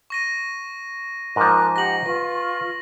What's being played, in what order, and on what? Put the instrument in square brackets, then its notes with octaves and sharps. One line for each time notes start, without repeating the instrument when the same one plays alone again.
[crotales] C#6 A#6 D#7
[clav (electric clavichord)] G#2 F3 [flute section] A#4 D6 F#6
[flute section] G4 F#5 A#5 [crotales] A#6 F#7
[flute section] F4 C#6 [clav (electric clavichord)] B4